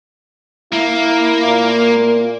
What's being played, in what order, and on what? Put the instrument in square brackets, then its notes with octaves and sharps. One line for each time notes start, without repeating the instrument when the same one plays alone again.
[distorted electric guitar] A#3 [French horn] E4
[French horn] A#2